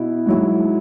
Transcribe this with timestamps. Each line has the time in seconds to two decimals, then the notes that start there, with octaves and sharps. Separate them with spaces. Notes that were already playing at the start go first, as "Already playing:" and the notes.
Already playing: B2 E4
0.26 G#2 F#3 E4